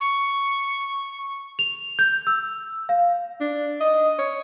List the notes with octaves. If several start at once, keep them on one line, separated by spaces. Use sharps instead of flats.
C#6
F7
G6
E6
F5
D4
D#5
C#5